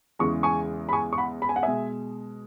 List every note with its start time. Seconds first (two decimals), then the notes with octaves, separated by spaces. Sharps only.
0.19 E2 C#3 E3 G#3 C#6
0.43 G#5 C#6
0.89 B5
0.93 G#5 C#6
1.13 C#6
1.18 F#5 B5
1.42 B5
1.49 G#5
1.56 F#5
1.63 B2 G#3 E5 G#5